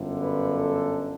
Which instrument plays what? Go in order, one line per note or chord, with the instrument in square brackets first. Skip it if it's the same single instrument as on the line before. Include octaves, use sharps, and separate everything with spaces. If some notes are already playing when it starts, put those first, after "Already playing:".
Already playing: [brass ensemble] G1 F#2 D3
B4
A4